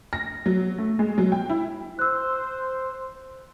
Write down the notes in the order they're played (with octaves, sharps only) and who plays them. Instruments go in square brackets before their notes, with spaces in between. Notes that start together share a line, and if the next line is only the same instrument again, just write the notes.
[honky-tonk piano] A#6
F#3
A3
G#3
F#3
G5
E4
[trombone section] C5 [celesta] E6 F#6